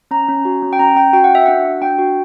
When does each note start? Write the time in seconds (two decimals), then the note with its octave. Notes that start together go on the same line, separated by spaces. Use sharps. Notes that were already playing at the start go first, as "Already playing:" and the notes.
0.11 C#4 A#5
0.28 C#4
0.45 F#4
0.62 C#4
0.73 G5
0.79 C#4 A#5
0.96 C#4 G5
1.13 F#4 G5
1.24 F#5
1.30 F#4 E5
1.46 D4 F#5
1.65 F#4
1.81 D4 G5
1.98 F#4